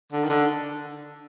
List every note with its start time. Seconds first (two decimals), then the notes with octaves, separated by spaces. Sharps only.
0.12 D3
0.24 D#3
0.29 D3